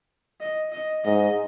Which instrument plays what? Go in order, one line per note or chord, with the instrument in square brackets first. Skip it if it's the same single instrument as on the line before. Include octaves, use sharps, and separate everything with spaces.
[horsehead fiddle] D#5
D#5
[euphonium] G#2 [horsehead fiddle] D#5